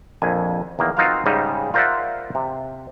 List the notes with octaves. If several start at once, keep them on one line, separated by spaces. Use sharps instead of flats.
A#1 F2 G#5
E2 D#3 A#3
C4 D#4 F4 F#4 A#4 F5
G#2 C#3 G3 D#4
F4 A#4 C5 D5 E5 F#5
C3